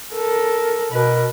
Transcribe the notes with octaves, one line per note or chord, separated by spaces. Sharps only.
A4 A#4
B2 A#4 B4